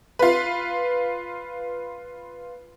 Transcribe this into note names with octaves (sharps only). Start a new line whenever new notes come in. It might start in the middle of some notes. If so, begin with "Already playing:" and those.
F4 B4